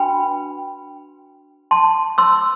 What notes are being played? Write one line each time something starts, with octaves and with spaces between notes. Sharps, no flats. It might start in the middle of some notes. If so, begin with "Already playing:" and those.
Already playing: D4 F#4 B4 G5 B5
A5 C6
C6 E6